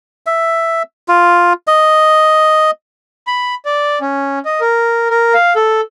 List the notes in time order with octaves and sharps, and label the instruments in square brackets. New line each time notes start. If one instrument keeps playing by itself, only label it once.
[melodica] E5
F4
D#5
[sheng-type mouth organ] B5
D5
C#4
D#5
A#4
A#4
F5
A4